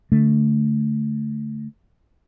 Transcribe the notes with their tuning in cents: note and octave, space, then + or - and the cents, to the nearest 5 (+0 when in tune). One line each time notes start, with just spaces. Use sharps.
D3 -20 A3 +0